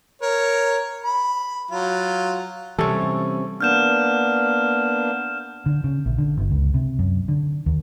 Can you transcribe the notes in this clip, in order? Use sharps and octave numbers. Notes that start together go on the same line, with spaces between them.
A#4 C#5
B5
F#3 F4
C3 E3 G3 C#4 A4
A#3 B3 D4 F6 G6 E7
D3
C#3
A#1
D3
G1
C#2
C3
F#2
D3
D#2